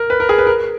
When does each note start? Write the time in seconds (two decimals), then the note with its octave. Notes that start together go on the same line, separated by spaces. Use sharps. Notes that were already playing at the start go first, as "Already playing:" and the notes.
Already playing: A#4
0.10 B4
0.20 A#4
0.29 G#4
0.38 B4
0.47 A#4